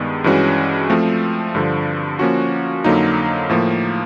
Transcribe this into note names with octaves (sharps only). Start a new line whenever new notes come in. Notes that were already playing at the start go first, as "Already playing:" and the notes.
Already playing: G2 D#3 G#3 B3
G2 E3 G#3 C#4 F#4
F3 A3 C4
G2 D3 F3
F3 A#3 C#4 F#4
F2 D3 F#3 A#3 D#4
A2 F3 A#3